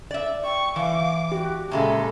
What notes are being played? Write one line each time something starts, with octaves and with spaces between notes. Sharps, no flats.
D5 E5
G5 C#6
E3 F5 D6
F#4 G4
A#2 C#3 G#3 A4 E5